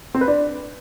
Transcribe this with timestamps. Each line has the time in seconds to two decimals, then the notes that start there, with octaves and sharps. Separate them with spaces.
0.14 C4
0.21 B4
0.28 D4